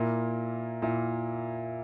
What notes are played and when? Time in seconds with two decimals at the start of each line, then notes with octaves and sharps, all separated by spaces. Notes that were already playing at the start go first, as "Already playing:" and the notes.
Already playing: A#2 A#3 E4
0.82 A#2 A#3 E4